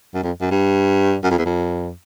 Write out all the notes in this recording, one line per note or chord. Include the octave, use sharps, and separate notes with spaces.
F#2
F2
F#2
G2
F#2
F2
E2
F2